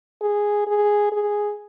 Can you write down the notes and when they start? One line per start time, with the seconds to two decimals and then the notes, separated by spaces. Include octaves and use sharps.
0.21 G#4
0.67 G#4
1.12 G#4